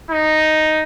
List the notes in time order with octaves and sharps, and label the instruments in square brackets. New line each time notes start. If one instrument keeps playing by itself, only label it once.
[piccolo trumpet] D#4